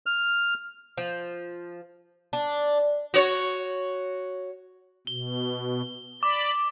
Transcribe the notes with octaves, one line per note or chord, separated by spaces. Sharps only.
F6
F3
D4
F#4 C#5
B2 G7
D5 B5 D6